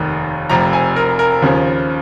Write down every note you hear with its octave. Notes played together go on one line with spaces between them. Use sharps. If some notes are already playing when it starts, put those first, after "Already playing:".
Already playing: F1 D#2 D#3
F1 F2 C3 A#5
G#5
A#4
A#4
D#2 C#3 F3